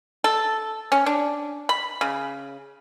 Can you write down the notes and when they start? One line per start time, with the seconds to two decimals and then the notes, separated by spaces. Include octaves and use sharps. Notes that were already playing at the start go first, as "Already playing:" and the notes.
0.24 A4
0.92 C#4
1.06 D4
1.69 B5
2.01 C#3